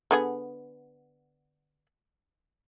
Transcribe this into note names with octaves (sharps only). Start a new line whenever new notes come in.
D3 B3 G#4